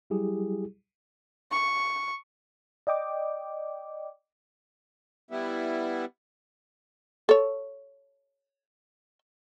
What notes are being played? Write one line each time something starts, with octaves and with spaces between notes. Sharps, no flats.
F#3 G3 E4 G4 G#4
C#6
D5 D#5 G5 D6
G3 B3 E4
A4 C#5